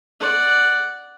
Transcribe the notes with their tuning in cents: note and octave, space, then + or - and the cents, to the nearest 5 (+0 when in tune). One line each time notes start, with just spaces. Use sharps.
D5 +0 F#5 +0